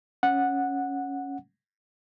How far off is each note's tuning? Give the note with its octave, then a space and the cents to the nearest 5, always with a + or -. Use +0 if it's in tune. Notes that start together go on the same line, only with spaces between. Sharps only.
C#4 +0 F#5 -10